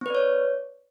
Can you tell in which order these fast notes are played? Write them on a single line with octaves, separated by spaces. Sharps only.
C4 B4 D5 C#5